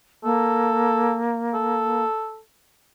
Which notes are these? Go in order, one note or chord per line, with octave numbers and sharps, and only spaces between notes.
A#3 A4
A4